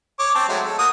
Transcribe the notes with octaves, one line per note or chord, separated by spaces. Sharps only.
C#5 D6
C4 A5
F#3 G#3 A3
A4
A#3 F#4 D#6